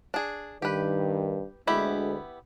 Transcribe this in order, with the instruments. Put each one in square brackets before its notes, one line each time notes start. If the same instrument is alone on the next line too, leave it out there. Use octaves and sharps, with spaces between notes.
[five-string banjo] D4 G#4
[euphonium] G2 [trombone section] D#3 [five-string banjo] G4 B4
[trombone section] D2 [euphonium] G#3 [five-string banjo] B3 E4 G4